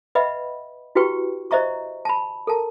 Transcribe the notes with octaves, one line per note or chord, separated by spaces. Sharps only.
B4 D#5 E5 F#5 B5
E4 F#4 G4 B4 G5 C#6
C5 D#5 E5 A#5 C#6
A5 B5
A4 A#4 A5 A#5